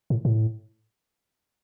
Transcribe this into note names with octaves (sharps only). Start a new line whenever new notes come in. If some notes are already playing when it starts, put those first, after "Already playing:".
A2
A2